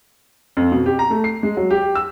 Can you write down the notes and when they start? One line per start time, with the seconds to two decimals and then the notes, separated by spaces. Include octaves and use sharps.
0.57 F2
0.72 B2
0.86 G4
0.99 A#5
1.11 A3
1.24 C7
1.43 G#3
1.57 F#3
1.70 G4
1.95 E6